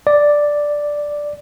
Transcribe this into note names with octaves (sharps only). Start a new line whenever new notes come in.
D5